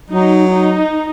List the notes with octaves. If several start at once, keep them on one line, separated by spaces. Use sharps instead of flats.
F#3 D#4
D#4